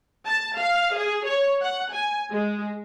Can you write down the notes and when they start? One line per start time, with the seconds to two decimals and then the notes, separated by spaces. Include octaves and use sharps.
0.26 A5
0.58 F5
0.95 G#4
1.26 C#5
1.62 F#5
1.92 G#5
2.30 G#3